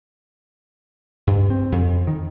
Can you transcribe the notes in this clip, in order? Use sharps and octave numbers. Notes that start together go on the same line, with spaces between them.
G2
C4
F2
D#3